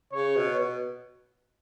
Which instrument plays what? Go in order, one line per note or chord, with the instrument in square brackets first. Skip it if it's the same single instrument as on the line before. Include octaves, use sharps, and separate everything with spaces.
[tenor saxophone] C#3 [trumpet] C#5
[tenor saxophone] B2
B2